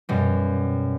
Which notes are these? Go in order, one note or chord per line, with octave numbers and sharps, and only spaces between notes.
F#2 B2 G3